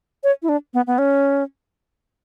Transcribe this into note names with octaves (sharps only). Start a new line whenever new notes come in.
C#5
E4
D4
B3
B3
C#4